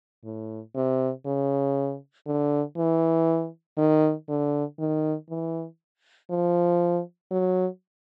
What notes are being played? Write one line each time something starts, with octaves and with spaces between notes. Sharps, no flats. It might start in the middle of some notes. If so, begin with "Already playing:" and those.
A2
C3
C#3
D3
E3
D#3
D3
D#3
E3
F3
F#3